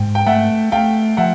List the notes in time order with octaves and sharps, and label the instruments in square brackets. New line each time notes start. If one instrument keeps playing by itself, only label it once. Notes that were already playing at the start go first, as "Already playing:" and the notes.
Already playing: [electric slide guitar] G#2 [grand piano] G5
[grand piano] G5
[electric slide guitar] A3 [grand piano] E5 F#5
[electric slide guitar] A3 [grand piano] F5 G5
[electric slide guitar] F3 [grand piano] E5 F#5